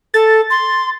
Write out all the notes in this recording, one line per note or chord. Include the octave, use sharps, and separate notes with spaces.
A4 A6
C6